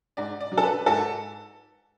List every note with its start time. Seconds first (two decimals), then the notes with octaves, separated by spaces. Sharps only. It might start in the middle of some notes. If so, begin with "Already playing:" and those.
0.17 G#2 D5
0.41 D5
0.52 F#3
0.58 A4
0.63 B4
0.86 G#2 A4